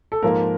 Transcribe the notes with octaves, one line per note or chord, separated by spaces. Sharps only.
A4
G#2 F3 A#3 A#4